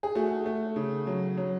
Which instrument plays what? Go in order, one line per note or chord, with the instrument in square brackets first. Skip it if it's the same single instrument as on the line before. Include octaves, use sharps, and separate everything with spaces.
[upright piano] G#4
A3 F#4
A3
C#3
F#3
F#3